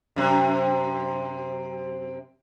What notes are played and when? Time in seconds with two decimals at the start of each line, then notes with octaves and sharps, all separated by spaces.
0.16 F#2 C3